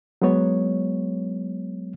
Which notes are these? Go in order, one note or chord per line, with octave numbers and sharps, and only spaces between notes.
F#3 G#3 B3 C#5